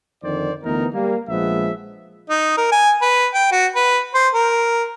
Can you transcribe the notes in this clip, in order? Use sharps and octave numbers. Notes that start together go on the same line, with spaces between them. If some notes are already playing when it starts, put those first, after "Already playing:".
F2 D3 D#3 C5 D5
D2 E3 B3 D#4 A#4
G3 A#3
A#1 F3 G#3 B3 E5
D#4
A#4
G#5
B4
G5
F#4
B4
C5
A#4